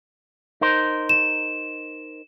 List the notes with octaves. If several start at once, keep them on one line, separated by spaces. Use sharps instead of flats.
D#4 A#4 C5
E7